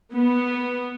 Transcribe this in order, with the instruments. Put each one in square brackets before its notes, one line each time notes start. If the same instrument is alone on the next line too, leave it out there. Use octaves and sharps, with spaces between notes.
[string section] B3